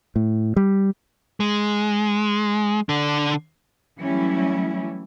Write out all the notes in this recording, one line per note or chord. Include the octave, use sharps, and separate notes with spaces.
A2
G3
G#3
D3 D4
E3 F#3 G3 A3 C#4 E4